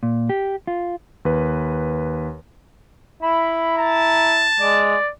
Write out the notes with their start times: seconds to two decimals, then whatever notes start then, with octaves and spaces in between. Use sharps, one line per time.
0.03 A#2
0.29 G4
0.67 F4
1.25 D#2 B4
3.23 E4 B5
3.78 A5 A#5
4.60 G#3 D5